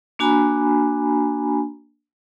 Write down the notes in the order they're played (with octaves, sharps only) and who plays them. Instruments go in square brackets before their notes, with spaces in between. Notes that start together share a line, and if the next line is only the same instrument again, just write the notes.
[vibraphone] A#3 D4 F#4 G#5 A#5 B5